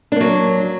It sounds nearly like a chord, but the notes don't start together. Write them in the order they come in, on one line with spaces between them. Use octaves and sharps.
D4 A#3 F#3